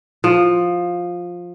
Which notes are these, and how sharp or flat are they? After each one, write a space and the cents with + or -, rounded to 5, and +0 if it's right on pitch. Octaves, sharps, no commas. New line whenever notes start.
F3 +10